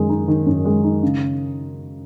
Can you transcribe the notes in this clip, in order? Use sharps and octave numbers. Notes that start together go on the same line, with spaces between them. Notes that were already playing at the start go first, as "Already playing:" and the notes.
Already playing: F#2 D#3 G#3
D#4
D#3
F#2
G#3
D#4
C#3